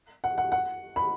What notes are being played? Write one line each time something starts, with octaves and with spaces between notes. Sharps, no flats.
F#5
F#5
F#5
B5